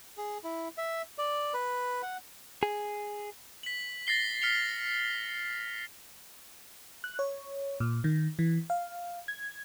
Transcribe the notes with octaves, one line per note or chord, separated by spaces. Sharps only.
G#4
E4
E5
D5
B4
F#5
G#4
B6 F#7
A6 A#6 C7 G7
F6 B6 C#7 F7 G7
F#6
C#5
A#2
D#3
E3
F5
G#6